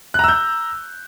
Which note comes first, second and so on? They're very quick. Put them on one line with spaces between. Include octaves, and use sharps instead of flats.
F#6 A#5 E6 G6